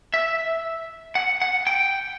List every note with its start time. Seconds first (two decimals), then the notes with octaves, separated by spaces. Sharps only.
0.14 E5
1.15 F#5
1.42 F#5
1.67 G5